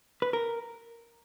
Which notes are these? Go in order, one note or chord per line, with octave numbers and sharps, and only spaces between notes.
B4
A#4